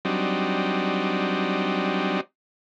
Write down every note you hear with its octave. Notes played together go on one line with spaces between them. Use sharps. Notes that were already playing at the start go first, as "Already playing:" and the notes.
F#3 G3 C4 D4 D#4